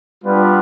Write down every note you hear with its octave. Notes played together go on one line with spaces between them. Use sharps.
G3 B3 D4 F4 B4